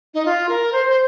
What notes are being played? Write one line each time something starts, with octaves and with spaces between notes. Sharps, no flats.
D#4
F4
A#4
C5
C5